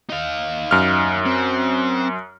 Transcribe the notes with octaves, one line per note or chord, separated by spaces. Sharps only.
D#4 F5
F#2 F6
C4